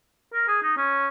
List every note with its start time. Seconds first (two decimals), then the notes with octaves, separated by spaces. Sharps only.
0.33 A#4
0.48 G#4
0.62 D#4
0.77 C#4